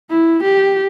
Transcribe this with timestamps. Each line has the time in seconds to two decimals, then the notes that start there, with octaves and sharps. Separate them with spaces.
0.10 E4
0.43 G4